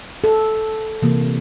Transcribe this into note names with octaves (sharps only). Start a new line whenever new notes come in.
A4
C3 E3 A#3